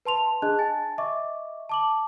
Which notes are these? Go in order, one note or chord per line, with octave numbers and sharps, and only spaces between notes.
B4 A5 C6 F7
D4 G#4 D#5 A5 F#6
G#5 A5 A6
D#5 E5 C#6 D6
A5 D6 F#7